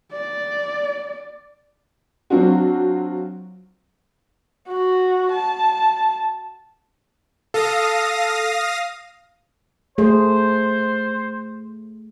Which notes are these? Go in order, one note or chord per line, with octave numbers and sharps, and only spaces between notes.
D5
F#3 C4 D4 F4 F#4
F#4
A5
A4 F5 D#6 A#6
A3 G#4 C5